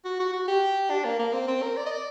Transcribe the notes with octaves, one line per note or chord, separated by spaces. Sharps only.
F#4
F#4
F#4
G4
D4
A#3
A#3
C4
C4
A#4
D5
D#5
D5